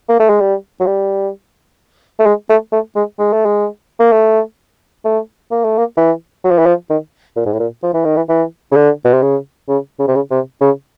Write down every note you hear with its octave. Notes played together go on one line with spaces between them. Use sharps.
A#3
A3
G#3
G3
F#3
G3
A3
G#3
A3
A3
G#3
G#3
A3
G#3
A#3
A3
A3
A#3
A3
A#3
E3
F#3
F3
E3
F3
D#3
A#2
G#2
A2
A#2
F3
E3
D#3
E3
E3
C#3
D3
B2
C3
C#3
C#3
C#3
C3
C#3
C3
C#3